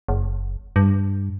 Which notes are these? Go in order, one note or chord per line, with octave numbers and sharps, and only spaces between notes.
F#1
G2